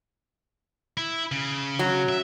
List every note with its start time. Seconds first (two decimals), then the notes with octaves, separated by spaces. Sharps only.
0.97 E4
1.32 C#3
1.79 F#3
2.09 E5